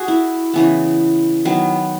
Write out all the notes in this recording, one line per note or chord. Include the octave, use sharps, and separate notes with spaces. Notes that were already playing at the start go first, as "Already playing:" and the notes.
Already playing: F#4 G#4
E4
C#3 E3 B3
D#3 F#3 B3